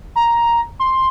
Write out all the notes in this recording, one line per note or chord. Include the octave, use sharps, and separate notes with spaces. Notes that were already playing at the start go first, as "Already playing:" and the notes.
A#5
C6